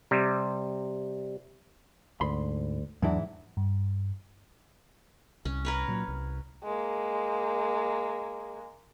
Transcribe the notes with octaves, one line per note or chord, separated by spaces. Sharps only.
C3 G3
D2 G#2 B5 C6
E2 G#2 E3 F#3 D4 E4
G2
C2 C#4
A#4 B4 C#5
A#2 F#3
C2
G#3 A#3